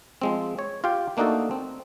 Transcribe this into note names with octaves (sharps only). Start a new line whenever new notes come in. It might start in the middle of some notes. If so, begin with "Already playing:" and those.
F3 G#3 C4
C#5
F4 G4 F5 G5
A3 A#3 D4 D#4 F#4 A4
C4